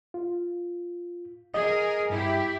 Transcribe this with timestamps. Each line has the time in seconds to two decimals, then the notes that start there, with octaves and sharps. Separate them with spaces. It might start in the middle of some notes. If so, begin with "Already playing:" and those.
0.14 F4
1.54 G#4 A#4 D#5
2.10 G2 E4 G4